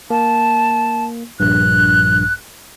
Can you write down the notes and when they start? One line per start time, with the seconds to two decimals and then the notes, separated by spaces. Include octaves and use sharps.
0.10 A#3 A5
1.40 A#1 G2 F#6